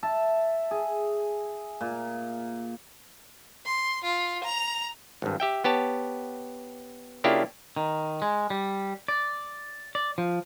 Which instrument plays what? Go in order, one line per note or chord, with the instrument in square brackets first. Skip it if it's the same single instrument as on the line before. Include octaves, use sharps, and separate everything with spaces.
[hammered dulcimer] E5 A5
G#4
A#2
[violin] C6
F4
A#5 F7
[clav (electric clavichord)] G#1 G2
G4 E5 G5
B3 G4 C#5 A5
C#3 A#3 D4 E4 F4 G4
[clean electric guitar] D#3
G#3
G3
D5
D5
F3